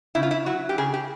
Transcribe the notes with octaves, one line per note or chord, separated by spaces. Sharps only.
C#3 E4
F4
E4
F#3 F#4
G4
C#3 G#4
G4